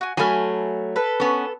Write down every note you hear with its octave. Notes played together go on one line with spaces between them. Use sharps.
F#4 G#5
F#3 A3 G#5 B5 F6
A4 B4
B3 C#4